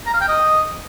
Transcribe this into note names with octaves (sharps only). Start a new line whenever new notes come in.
A#5
F5
G5
D#5